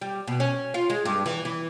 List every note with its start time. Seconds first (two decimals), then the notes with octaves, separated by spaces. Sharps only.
0.01 G3
0.27 B2
0.40 C#4
0.74 F4
0.90 G#3
1.05 G2
1.26 E3
1.45 E3